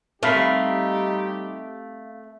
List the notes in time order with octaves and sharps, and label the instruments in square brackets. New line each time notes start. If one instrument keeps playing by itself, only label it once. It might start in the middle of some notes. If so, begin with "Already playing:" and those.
[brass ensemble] G3 D#4 G4 [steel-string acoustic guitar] A3 [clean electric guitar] C4 F5 B5